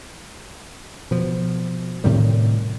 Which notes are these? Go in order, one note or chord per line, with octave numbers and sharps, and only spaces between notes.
B2 F3
A2 C3 D#3 G3